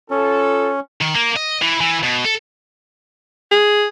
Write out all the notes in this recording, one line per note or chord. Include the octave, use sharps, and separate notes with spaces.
C#4 F4 A4
D#3
A#3
D#5
E3
E3
B2
A4
G#4